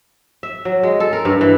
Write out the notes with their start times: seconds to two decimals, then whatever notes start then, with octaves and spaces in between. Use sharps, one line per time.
0.43 E5
0.65 F#3
0.83 G#3
1.00 A4
1.13 A#4
1.25 G2
1.41 E3